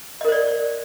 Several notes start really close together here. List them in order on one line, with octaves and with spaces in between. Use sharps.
D#5 A#4 C5 D5